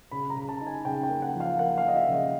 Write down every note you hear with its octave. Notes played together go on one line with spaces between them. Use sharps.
C#3 B5
A#5
C#3
A5
D#4
G#5
C#3 G5
G5
A#3
F#5
F3
F5
A#3 F#5
F5
F3 D#5
E5
C#3
D#5